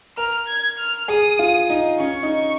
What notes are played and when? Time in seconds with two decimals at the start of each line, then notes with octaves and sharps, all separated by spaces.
0.17 A#4 F6
0.48 G#6
0.78 F6
1.08 G#4 D#6
1.39 F4
1.70 D#4
2.00 C#4 C#6
2.23 D#4